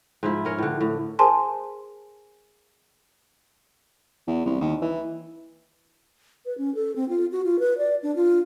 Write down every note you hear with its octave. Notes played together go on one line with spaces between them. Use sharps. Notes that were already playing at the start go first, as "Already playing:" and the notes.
G#2 F3 E4
C#4 A#4 C#5
A2 D3
A2
G#4 A#4 C5 G#5 A5 C6
E2
C2
D#2
E3
B4
C#4
A4
C4
F4
F#4
F4
B4
D5
D4
F4